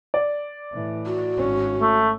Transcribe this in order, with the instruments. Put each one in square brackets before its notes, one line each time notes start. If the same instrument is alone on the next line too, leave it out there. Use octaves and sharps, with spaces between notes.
[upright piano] D5
[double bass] A2 E3
[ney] F#4
[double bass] G#1 C#4
[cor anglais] A3